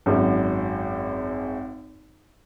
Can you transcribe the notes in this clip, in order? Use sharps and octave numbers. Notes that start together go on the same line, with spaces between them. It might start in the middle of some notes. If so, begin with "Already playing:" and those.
G#1 F#2